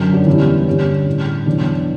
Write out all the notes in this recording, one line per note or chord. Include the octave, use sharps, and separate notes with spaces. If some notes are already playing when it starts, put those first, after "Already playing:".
Already playing: F#2 D3 F#3
D4 F#4
E2 B2 G3 C#4 E4
G2 D3 G3 C#4
A2 G3
E2 B2 F#3 D4